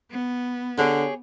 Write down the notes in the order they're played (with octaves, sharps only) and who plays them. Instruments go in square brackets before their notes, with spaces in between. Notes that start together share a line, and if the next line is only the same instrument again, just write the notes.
[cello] B3
[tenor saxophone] D3 [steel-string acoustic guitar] G4 G#4 C#5